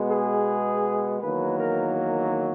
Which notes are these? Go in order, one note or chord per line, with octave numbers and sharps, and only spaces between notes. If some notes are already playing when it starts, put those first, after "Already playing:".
Already playing: B2 G#3 B3
G#4
E2 D#3 F#3 A#3 B4
A#4
A#4